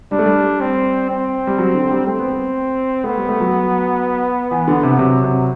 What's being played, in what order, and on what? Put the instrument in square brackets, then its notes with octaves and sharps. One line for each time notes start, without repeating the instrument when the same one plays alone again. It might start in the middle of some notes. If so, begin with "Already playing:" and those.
[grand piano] G3 [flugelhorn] D4
[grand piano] A3
G3
[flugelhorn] C4
C4
[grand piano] G3
F#3
D3
G3
[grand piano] A3 [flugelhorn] C4
[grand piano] B3
B3
[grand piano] A3 [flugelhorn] B3
[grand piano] G3
A3
F#3
E3
D3
C3
[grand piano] C3 [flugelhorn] F#3
[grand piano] C3